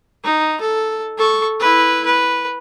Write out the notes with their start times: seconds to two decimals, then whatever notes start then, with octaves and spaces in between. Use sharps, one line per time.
0.24 D#4
0.61 A4
1.18 A4 C#6
1.60 E4 B4
2.06 B4